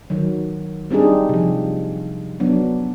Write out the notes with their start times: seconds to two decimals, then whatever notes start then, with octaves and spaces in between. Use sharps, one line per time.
0.10 D#3 F#3
0.91 G3 C4 D4 D#4 G#4
1.29 C3 F3
2.40 F#3 B3 D4